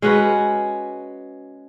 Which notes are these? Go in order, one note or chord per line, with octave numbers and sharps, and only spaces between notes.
G#3 C#4 F#4 B4